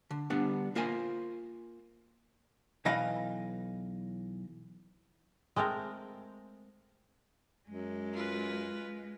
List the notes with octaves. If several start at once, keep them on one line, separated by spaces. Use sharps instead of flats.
D3
D3 G3 B3 D4
A#3 F4 A#4 C5 G#5
B1 E3 D#5 F5 B5
G#3 A3 C4 A#4
F#2 G#3
F4 B4